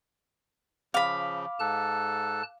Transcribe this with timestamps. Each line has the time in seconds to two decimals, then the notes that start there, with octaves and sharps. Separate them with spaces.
0.94 C#3 F3 F5 B5 D6
1.60 G#2 A4 A5 F#6